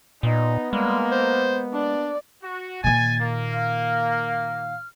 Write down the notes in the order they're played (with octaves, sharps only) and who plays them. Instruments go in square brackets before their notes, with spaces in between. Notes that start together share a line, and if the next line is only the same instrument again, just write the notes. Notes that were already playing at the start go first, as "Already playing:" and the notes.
[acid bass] A#2 [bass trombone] B3 [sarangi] D#4
[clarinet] G3 [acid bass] G#3 [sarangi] A#3
[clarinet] C5
[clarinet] D4 [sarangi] D5
[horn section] F#4
[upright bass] A#2 D#3 [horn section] G#5 [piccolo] A6
[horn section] A#3
[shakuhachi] F5 [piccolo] F6